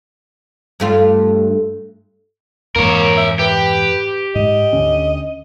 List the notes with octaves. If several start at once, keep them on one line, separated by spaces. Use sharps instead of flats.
G2 A3 F4
F2 G#2 E3 A#3 A#4 C#5
E5
G4 B4
G#2 D#5
D2 D3 C#4